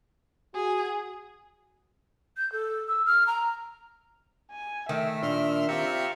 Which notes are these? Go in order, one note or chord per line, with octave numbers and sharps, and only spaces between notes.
F#4 G#4
G6
A4
E6
F6
A#5
G#5
D#3 A3 E5
A#2 D4 C6 F6
C4 F4 G4 F5 A#5 C#6